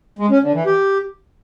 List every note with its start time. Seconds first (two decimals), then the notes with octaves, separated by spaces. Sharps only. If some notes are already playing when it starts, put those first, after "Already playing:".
0.19 G#3
0.31 C#4
0.42 D3
0.54 E3
0.66 G4